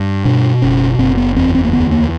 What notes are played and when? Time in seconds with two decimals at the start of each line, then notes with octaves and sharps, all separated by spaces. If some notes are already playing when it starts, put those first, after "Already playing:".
Already playing: G2
0.25 B2 D4
0.62 F#1 C#4
0.99 F#1 C4
1.17 B3
1.36 E2 C4
1.55 C4
1.65 A#3
1.73 D2 B3
1.92 A#3